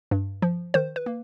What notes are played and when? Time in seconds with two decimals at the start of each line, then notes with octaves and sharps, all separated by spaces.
0.11 G2
0.42 F3
0.74 D#3 C5
0.96 B4
1.06 A#3